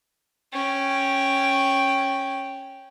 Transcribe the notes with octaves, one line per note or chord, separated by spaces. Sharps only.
C#4 G5